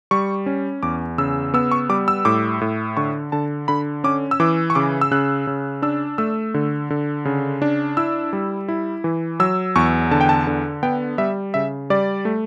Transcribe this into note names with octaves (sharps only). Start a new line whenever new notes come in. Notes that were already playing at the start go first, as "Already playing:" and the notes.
G3 C#6
C#4
E2 D6
C#3 E6
B3 E6
C#6
G3 D6
E6
A2 D6
A2
D3 C#6
D3 A5
D3 B5
C#4 D6
E6
E3 D6
C#6
C#3 D6
E6
C#3 F#6
C#3
D4 E6
A3 E6
D3
D3
C#3
D4
E4 E6
G3
E4
E3
F#3 E6
E2 C#6
D3 A5
G5
A5
D3
B3 G5
G3 E5
C#3 E5
G3 D5
A3